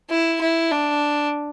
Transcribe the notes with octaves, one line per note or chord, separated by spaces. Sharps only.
E4
E4
D4